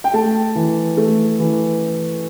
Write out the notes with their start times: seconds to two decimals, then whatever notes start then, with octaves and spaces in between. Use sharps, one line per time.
0.04 G5
0.13 A3 A5
0.55 E3
0.97 A3
1.40 E3